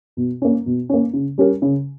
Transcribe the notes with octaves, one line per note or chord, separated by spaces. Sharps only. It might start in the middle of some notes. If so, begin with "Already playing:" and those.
B2
A#3 C#4
B2
A#3 C#4
C#3
G3 C#4 G4 A#4
C#3